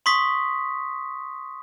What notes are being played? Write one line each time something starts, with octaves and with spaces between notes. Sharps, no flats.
C6 C#6 D#6 B6